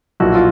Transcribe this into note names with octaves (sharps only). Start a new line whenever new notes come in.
B1 A#2 F3 E4 F#4
F4